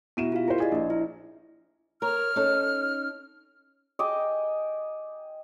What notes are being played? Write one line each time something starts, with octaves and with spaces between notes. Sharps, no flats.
B2 E4 E5 D#7 E7
F4 G4 F5
E4 A#4 C5
G#4 D5 D#5
A#1
E4
A#4 C#5 F6
C#4 D#4 A4
D#5 G5 G#5 D6